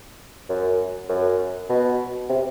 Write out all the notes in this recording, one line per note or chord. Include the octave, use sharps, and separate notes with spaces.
F#2
F#2
B2
C3